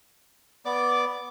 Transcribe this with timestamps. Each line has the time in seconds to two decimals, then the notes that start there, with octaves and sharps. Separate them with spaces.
0.65 B3 D5 D6